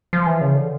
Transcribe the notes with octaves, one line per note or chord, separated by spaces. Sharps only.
F3
E3
C#3
D3